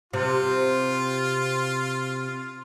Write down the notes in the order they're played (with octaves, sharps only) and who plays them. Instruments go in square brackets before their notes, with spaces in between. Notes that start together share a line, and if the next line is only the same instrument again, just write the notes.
[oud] C3 [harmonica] F4